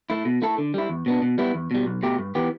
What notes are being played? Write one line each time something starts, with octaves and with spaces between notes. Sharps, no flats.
A3 E4
B2
A3 E4 A4
D3
G3 E4
E2
B2 B3 D4
B2
G3 B3 E4
E2
B2 G3
B1
B2 A3 G4
G2
E3 B3 G4